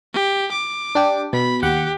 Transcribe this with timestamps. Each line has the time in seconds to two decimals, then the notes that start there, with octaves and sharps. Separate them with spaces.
0.14 G4
0.51 D6
0.95 D4 G4
1.33 B2 B5
1.63 D#2 G4 F#5